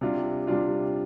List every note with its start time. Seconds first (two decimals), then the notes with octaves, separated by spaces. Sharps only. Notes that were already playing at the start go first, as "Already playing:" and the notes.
0.01 C3 G3 D4 F4
0.47 C3 G3 D4 F4